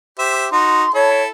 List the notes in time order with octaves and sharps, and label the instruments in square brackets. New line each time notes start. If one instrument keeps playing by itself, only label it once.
[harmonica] G4 C5 E5
[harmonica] D#4 F#4 [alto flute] C6
[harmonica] E4 A4 [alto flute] C#5